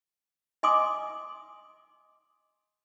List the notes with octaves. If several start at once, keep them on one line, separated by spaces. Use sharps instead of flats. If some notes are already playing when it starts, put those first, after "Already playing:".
D#5 G#5 C6 D6 D#6